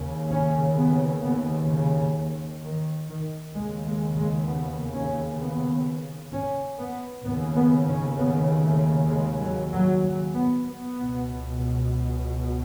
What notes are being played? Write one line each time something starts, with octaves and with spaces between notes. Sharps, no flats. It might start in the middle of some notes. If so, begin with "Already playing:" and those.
Already playing: D#2 C#3
C#4
B3
B3
C#3
D#3
D#3
D#2 C#3 G#3
G#3
G#3
B3
C#4
B3
C#4
B3
D#2 C#3 B3
B3
C#4
B3
A3
G#3
F#3
F#3
F#3
B3
B3
C#2 B2